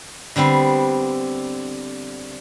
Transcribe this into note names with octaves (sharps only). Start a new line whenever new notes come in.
D3 G3 B3 C4